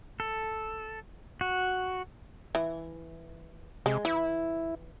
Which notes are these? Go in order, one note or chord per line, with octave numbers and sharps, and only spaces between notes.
A4
F#4
E3
C3 G#3
E3 E4